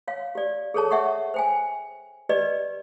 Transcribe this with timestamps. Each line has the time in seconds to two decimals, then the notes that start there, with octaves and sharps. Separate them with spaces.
0.08 C#5 F5
0.35 G4 D5
0.74 G#4 A4 C#5 A5
0.91 C#5 E5 F#5 C#6
1.34 C5 G5 G#5
2.29 G4 B4 D5 D#5